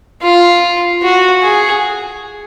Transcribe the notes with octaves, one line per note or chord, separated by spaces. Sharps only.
F4
F#4
G#4